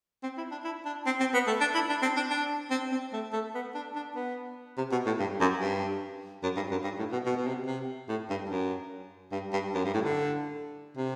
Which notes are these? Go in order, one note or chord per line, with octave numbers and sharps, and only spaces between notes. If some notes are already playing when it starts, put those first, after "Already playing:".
C4
E4
D4
E4
D4
C4
C4
B3
A3
D4
E4
D4
C4
D4
D4
C4
C4
A3
A3
B3
D4
D4
B3
C3
B2
A2
G2
F#2
G2
F#2
G2
F#2
G2
A2
B2
B2
B2
C3
C3
A2
G2
F#2
G2
G2
F#2
G2
A2
D3
C3